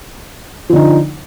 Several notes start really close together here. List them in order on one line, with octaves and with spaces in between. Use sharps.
F3 D3 D#4